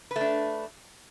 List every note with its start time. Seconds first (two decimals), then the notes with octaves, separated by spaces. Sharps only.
0.11 B4
0.16 A3
0.21 D4